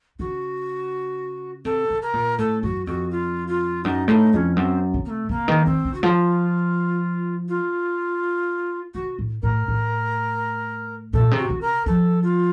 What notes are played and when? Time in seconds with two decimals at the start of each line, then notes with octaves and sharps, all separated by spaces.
0.19 C#3 F#4
1.65 C3 A4
1.90 C3
2.02 A#4
2.13 A#2
2.38 A2 A4
2.63 F#2 F#4
2.86 F2 F#4
3.11 F4
3.48 F4
3.84 F#2 D#4
4.08 A2 F4
4.11 D#4
4.33 F2 C#4 D#4
4.56 F#2 C4
4.94 C3
5.05 A#3
5.10 A3
5.29 C3 A#3
5.48 D#3
5.66 D#3 C4
5.85 C#3
5.94 F#4
6.03 F3 F4
7.48 F4
8.94 C3 F#4
9.19 A2
9.42 A2 A#4
9.68 A2
11.13 A#2 A4
11.31 C3
11.37 F#4
11.50 C3
11.61 A#4
11.86 F3 A4
12.23 F4